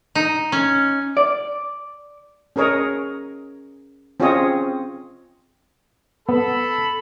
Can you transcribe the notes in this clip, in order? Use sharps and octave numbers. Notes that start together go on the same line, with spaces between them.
D#4
C#4
D5
C#4 G#4 A#4 C#5 D#5
C4 C#4 F4 G#4 C#5 D#5
B3 A4 B5